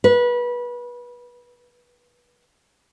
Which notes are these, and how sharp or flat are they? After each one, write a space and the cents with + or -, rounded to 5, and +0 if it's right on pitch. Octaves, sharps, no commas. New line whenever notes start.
B4 -25